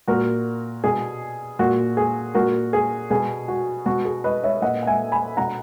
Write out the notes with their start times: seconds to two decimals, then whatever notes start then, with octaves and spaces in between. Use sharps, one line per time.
0.08 A#2 F#4 A#4
0.84 B2 G#4
1.59 A#2 F#4
1.97 G#4
2.35 A#2 F#4 A#4
2.73 G#4
3.10 B2 G#4
3.48 F#4
3.86 B2 F#4
4.05 G#4
4.24 B4 D#5
4.44 C#5 E5
4.62 A#2 D#5 F#5
4.83 F#5
4.87 E5 G#5
5.12 G#5 B5
5.37 B2 F#5 A#5